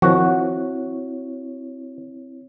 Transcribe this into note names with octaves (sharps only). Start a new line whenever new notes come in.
D#3 F3 C4 E4 F#4 C#5